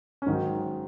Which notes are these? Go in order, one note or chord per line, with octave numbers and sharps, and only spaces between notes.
C#4
G#2 D#3 F#3 D#4